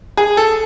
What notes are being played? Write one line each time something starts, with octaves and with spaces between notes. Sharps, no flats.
G#4
A4